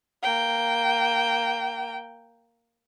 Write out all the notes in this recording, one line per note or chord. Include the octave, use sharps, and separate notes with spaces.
A#3 G5